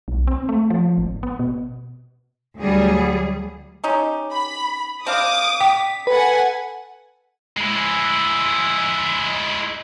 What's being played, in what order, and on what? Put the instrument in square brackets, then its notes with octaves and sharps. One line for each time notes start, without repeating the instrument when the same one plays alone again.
[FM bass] B1
C4
A3
F3
G#1
B3
B2
[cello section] D2 F#3 G3 G#4
[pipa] C#4 D#4 G4
[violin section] B5
[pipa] C4 D4 F5 [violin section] D6 D#6
[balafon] G5 [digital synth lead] B6
[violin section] A4 F#5 G#5 [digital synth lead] B4
[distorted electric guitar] G#3 E4